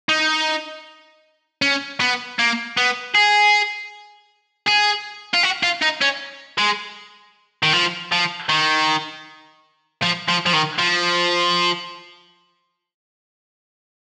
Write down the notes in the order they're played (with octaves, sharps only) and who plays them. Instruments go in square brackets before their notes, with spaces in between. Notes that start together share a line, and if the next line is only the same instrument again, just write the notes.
[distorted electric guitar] D#4
C#4
B3
A#3
B3
G#4
G#4
F4
F#4
F4
D#4
C#4
G#3
D#3
F3
F3
D#3
F3
F3
F3
D#3
F3